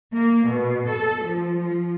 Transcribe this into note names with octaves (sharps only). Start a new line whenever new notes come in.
A#3
B2
A4
F3
F3